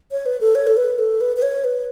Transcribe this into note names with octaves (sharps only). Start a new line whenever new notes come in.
C#5
B4
A4
C#5
A4
B4
A4
B4
B4
C#5
B4